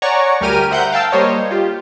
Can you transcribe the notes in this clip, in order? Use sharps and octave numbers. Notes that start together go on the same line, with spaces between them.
C#5 D5 F#5 G#5 A#5 C#6
D2 G3 G4 A#4 F6 D#7
C5 E5 F#5 A#5 G6
F5 G5 A5 E6
G3 A#3 C5 C#5 D#5
F4 G4